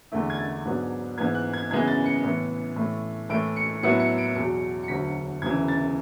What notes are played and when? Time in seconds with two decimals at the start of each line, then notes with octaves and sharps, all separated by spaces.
0.12 E2 D3 A3 E4
0.30 G#6
0.38 A6
0.65 G#2 F#3 B3 D4
1.18 G#2 E3 B3 G#6
1.35 F#6
1.54 G#6
1.71 F#2 C#3 E3 G#3 B3 G#6
1.88 A6
2.05 C#7
2.23 A2 E3 B3
2.76 A2 E3 A3
3.29 A2 E3 A3 D7
3.56 C#7
3.83 A2 F#3 B3 E4 C#7
4.00 C#7
4.18 D7
4.35 E2 B2 F#3 C#7
4.83 C#7
4.88 E1 D2 D3 F#3 B6
5.42 E1 D2 C#3 E3 G#6
5.68 A6